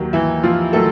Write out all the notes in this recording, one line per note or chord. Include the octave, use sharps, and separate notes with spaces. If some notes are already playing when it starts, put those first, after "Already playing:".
Already playing: D#2 D#3 F#3
E3 E4
F3 F4
D#3 F#3 A3 A4